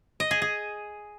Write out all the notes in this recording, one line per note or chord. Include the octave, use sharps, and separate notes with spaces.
D#5
G#4
G#4